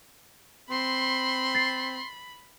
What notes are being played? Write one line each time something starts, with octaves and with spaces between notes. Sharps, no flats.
C4 B5 C6
A6 C7